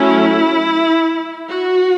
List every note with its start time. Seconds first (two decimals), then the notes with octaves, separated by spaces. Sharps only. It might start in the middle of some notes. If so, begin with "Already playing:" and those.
Already playing: F#3 A3 C#4 E4
1.49 F#4